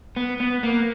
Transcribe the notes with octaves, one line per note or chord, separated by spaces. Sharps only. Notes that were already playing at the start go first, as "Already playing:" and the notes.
B3
B3
A#3